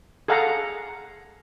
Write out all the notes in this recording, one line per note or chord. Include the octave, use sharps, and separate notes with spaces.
G#4 A4 F5 F#5 A#5